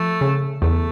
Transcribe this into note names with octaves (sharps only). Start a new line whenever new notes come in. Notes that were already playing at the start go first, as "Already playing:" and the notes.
Already playing: F3 A3
C#3
E2 A3